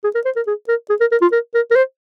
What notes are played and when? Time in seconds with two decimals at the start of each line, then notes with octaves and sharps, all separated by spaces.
0.04 G#4
0.15 A#4
0.25 C5
0.36 A#4
0.47 G#4
0.68 A#4
0.90 G#4
1.01 A#4
1.12 A#4
1.22 F4
1.32 A#4
1.54 A#4
1.71 A#4
1.76 C5